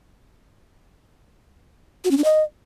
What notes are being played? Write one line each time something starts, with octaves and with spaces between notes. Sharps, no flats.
F#4
C#4
D4
D#5